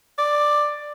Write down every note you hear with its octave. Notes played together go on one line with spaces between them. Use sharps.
D5